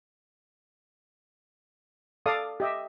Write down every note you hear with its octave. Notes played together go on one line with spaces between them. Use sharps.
A4 D5 F5 D#6
G4 D#5 E5